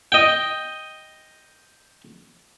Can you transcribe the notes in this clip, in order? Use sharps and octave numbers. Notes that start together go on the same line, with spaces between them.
D#5 G5